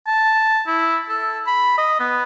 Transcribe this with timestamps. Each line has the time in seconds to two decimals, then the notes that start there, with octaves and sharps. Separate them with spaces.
0.07 A5
0.67 E4
1.09 A4
1.47 B5
1.77 D#5
2.00 B3